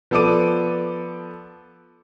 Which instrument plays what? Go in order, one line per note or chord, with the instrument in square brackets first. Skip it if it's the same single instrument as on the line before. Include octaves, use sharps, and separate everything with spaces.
[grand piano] F3 B3 A4 D5 D6 D#7